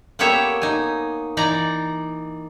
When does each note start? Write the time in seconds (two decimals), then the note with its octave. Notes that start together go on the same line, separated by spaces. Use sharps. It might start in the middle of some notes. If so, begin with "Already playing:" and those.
0.19 A#3 B3 G4 A4 C#5 E5
0.62 D#4 G#5
1.37 E3 D#4 D5 A#5